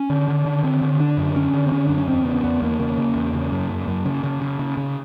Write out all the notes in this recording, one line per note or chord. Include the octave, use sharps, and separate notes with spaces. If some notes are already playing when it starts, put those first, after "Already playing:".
Already playing: C#4
D3
D3
D3
D3 C4
D3
D3 D4
F#2
D3 C#4
D3
C4
D3 C#4
F#2 D4
C#4
E2 C4
C#3 B3
E2 B3
E2 A#3
C#3 A#3
C#3
E2
C#3
F#2
F#2
F#2
C#3
C#3
C#3
C#3
C#3